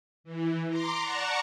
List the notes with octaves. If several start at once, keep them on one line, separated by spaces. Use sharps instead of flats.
E3
A#5 C6 D6
D5 F#5 A5 A#5 C#6